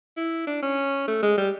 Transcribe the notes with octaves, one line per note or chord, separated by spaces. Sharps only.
E4
D4
C#4
A3
G#3
G3